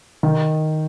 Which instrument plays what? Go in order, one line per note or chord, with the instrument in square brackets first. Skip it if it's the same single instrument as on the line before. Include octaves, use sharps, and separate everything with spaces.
[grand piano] D#3